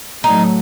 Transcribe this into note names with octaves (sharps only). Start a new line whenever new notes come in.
A2 F#3 A3 D#4